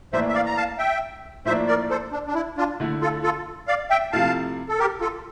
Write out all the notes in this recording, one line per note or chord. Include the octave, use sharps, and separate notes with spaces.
A2 E3 A#3 D4 C5 E5
E5
D5 F5
A#5
F5 A5
E5 G5
A2 F3 A#3 D4 C5 E5
A#4 D5
A4 C5
D4
D4
E4
D4 F4
D3 A3 E4
F4 A4
F4 A4
D5 F5
E5 G5
C3 F3 A3 E4 F5 A5
A4
G4 A#4
F4 A4